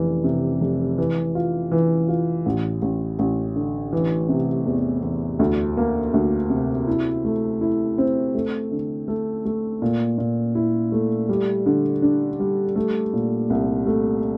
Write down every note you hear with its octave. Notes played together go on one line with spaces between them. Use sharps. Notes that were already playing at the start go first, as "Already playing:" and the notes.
Already playing: F1 E3
C3
F1
E3
F4
E3
F4
A1
A1
A1
D3
E3
C3
E2
E2
D2
A#3
D2
C3
E4
A3
E4
C4
A3
D3
A3
A3
A#2
A#2
E4
A3
G3
D3
D4
G3
A3
A#2
C2
A3